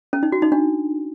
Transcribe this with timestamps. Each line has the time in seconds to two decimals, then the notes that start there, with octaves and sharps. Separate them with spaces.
0.13 C#4
0.23 D#4
0.32 F#4
0.42 D#4
0.52 D4